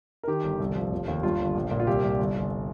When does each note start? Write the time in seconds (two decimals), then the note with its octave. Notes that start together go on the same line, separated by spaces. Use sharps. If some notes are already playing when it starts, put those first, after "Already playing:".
0.23 A#4
0.28 D#3 G4
0.44 G1
0.60 C2
0.76 F3
0.91 F1
1.08 D#2
1.23 G2 F4
1.39 G1
1.55 A#1
1.71 A#2
1.80 F4
1.87 C2 G4
2.03 C2
2.19 G1
2.35 G1